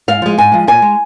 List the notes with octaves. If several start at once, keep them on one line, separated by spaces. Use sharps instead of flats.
G#2 F5
F3 G#3
G#2 G#5
F3 G#3
A#2 G#5
G#3